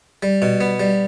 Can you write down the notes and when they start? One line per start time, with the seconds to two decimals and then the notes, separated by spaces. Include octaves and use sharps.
0.23 G3
0.42 B2
0.61 B3
0.80 G3